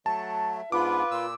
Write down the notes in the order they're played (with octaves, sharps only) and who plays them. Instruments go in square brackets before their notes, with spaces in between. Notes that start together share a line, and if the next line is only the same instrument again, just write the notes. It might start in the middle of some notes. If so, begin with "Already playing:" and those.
[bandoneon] F#3 A3 [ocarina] F#5 [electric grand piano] A5
[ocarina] E5
[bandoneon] G#2 B3 D4 [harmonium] F4 B4 [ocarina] B5 [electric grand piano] D6
[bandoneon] A#2 E6 [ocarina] C6